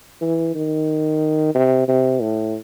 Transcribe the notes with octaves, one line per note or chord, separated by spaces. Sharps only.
E3
D#3
C3
C3
A2